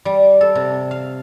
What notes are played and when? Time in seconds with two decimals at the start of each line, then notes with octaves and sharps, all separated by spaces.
0.05 G3
0.41 A4
0.55 C3
0.91 F5